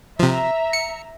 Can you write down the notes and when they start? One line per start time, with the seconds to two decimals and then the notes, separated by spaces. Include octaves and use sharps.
0.19 C3 F3 E5 A#5
0.73 C#7